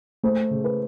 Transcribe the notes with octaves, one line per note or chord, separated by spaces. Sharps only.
A3 C5
C#3
B4